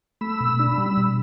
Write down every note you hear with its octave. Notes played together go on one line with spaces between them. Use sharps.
A3 B5 E6
B2
D4
G3
B2